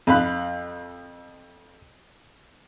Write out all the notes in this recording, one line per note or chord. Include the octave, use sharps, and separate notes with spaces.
F2 F5 B5 F#6